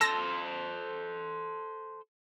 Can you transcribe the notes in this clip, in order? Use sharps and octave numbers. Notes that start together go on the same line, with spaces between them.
A4 C5 A5 E6 A#6